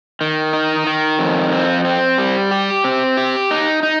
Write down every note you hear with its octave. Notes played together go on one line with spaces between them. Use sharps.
D#3
D#4
D#3
F2
C4
C4
G3
G4
C4
G4
D#4
D#4